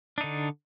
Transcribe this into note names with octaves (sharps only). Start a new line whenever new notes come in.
D3 D4 D#4